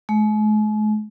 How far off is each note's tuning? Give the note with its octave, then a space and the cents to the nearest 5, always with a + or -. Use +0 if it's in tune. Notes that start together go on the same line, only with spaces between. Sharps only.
G#3 +45